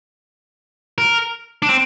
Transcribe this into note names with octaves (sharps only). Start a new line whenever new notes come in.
A#4
D4
C4